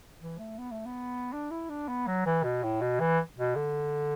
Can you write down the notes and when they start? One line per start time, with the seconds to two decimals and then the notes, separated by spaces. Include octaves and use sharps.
0.21 E3
0.39 A3
0.59 B3
0.71 A3
0.86 B3
1.33 D4
1.51 E4
1.69 D4
1.88 B3
2.07 F#3
2.26 E3
2.44 B2
2.63 A2
2.81 B2
3.00 E3
3.37 B2
3.55 D3